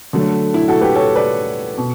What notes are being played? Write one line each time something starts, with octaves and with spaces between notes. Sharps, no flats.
D3 F#3 A3
E4
F#4 A4
G4 B4
A4 C#5
B4 D5
B2